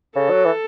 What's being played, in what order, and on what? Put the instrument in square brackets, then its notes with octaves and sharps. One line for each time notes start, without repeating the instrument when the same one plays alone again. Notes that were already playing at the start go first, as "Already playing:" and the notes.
[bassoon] C#3 [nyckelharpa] A4
[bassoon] F#3
E3